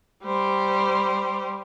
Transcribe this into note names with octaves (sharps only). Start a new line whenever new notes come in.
G3 C5